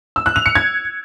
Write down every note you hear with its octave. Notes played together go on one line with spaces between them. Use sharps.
E6
F#6
F7
C#7
G#6